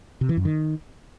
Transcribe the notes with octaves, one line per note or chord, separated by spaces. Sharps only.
C3
E3
F#2
D#3